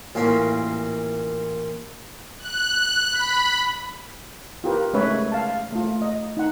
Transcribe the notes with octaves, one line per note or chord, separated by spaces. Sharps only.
A1 A#2 A#3 C#4 C6
F#6
B5
F4 G4 A#4 B4
G#3 A3 C#4 B4 C#5 E5
F5 A5
A3 F4
D#5
D#4 F#5